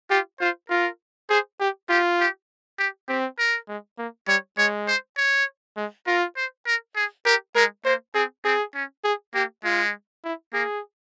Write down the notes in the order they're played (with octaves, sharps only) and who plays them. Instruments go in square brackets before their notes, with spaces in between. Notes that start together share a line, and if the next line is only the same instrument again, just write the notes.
[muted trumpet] F4 [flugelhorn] G4
[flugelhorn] F4 [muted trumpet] C5
[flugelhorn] F4 [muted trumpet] A#4
[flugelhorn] G#4 [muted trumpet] C5
[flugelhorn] G4
[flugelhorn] F4 [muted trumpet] G4
[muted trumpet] G4
G4
[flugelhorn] C4 [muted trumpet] G4
[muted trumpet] A#4
[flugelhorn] G#3
A#3
[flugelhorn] G3 [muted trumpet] C#5
[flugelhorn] G#3 [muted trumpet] C#5
[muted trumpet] C5
C#5
[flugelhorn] G#3
[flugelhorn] F4 [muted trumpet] A#4
[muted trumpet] C5
A#4
G#4
[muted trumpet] G4 [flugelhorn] A#4
[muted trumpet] G#3 [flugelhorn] A#4
[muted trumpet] A#3 [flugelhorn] C5
[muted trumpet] C4 [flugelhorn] G#4
[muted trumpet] C4 [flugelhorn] G#4
[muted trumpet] C#4
[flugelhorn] G#4
[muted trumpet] A#3 [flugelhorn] G4
[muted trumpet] G#3 [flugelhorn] F4
[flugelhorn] E4
[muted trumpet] A#3 [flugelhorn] G#4